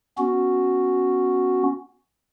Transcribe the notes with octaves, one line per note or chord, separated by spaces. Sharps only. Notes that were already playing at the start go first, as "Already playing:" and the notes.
B3 C#4 F#4